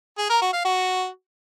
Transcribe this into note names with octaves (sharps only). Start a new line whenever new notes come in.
G#4
A#4
F#4
F5
F#4